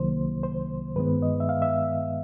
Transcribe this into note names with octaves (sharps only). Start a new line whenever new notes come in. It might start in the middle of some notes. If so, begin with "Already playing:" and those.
Already playing: C2 C3 D#3 F#3 A#3 C5
C5
G2 D#3 G#3 B3 B4
D#5
E5
F5
E5